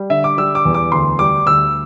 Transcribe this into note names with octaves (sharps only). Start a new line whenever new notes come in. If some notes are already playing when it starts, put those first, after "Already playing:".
Already playing: G3
D3 E5
D6
G3 E6
D6
E2
D6
D2 C6
G3 D6
D2 E6